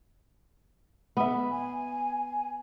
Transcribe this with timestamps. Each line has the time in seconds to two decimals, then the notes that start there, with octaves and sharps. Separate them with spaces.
1.17 B3 E5
1.51 G#5